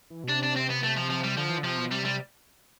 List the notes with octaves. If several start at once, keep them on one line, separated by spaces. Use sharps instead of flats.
E3
B2
C3 D4
D4
C4
B3
A3
F3
F3
G3
D3 F3
E3
D3
C3 F3
B2
C3 G3
G3